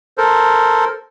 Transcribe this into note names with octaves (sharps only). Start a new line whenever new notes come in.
A4 A#4 C5